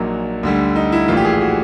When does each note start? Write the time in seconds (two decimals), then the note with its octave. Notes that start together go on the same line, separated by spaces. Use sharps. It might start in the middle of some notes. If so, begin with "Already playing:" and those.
Already playing: A#1 A#2 F#3 D#4
0.43 D2 D3 G3
0.76 D#4
0.92 E4
1.08 A#1 A2 E3 F4
1.17 G4
1.25 G#4
1.33 G4
1.41 F#4